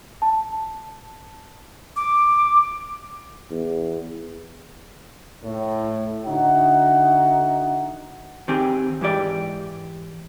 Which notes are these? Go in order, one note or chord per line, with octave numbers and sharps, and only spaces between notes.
A5
D6
E2
A2
D3 D#4 F#4 E5 F#5
D#3 C4 G4 G#4
G#2 E3 G#3 G4 D5